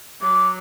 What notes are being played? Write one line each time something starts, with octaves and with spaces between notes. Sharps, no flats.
F#3 D6